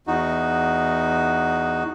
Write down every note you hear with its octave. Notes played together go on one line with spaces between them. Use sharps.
E2 D#4 F#4